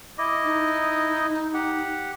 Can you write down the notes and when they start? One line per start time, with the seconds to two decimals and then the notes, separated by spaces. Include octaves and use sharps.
0.18 E4 D#5 D6
0.44 D#4
1.54 G4 F#5